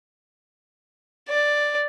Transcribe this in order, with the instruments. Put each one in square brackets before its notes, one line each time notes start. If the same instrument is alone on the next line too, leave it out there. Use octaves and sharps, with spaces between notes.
[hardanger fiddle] D5